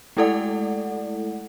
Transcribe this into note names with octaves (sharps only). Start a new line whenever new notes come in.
G#3 A3 E4 A4 D5 F#5